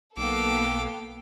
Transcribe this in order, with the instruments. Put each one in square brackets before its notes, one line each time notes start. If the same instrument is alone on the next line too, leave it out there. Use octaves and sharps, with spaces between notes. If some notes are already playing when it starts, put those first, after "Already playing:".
[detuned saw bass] B1 [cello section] A#3 B3 [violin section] A4 F5 G5 [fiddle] D6 E6